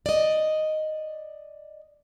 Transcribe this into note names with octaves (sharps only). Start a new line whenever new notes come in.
D5 D#5